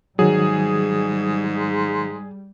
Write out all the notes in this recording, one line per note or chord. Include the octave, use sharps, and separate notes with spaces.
G#2 D#3 F#3 G3 G#4